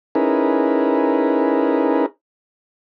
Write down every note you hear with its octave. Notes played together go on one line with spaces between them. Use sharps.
C#4 D#4 E4 G#4 A#4 B4